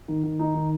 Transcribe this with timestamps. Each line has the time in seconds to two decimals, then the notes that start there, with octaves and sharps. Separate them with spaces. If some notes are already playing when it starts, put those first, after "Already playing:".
0.08 D#3
0.23 D#3
0.39 D#4
0.54 D#3